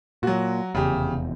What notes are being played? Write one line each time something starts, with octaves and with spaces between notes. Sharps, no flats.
A#2 F#3 F#4
F1 E2 C#3 G4